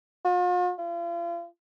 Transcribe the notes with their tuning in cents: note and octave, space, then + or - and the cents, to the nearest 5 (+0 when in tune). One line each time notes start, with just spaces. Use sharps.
F4 +45
F4 -40